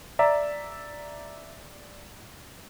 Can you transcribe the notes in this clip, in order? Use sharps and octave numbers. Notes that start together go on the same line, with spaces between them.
D5 E5 A#5